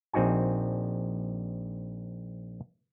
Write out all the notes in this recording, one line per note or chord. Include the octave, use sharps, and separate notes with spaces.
A#1 C4 D#4 F#4 G#5